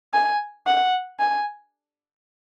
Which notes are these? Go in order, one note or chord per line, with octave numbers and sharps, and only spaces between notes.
G#5
F#5
G#5